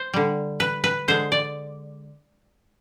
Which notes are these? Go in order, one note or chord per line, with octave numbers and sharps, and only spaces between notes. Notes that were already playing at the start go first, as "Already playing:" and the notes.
Already playing: C5
D3 G3
B4
B4
D3 G#3 C5
D5